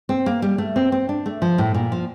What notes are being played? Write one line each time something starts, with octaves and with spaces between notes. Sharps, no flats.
C4
A#3
G3
A3
C4
C4
D4
A3
F3
A2
A#2
F3